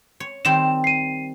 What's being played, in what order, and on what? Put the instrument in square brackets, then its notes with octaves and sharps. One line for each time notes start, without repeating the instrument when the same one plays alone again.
[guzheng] C#5
[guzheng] D#3 G3 C4 [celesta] E7
[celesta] C7 D#7